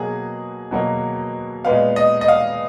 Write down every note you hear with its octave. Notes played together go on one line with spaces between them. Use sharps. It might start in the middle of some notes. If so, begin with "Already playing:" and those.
Already playing: B2 F#3 A#3 G#4
B2 F#3 A#3
A#2 G#3 B3 F5
D#5
D#5
F5